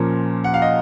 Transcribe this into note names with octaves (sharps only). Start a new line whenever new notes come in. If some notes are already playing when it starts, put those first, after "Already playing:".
Already playing: A#2 F3 A#3 C#4
F#5
F5
D#5